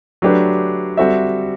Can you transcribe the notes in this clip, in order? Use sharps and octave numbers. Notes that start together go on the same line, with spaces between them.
F#3 A3 D4 G4 B4
G3 C4 F#4 A4 E5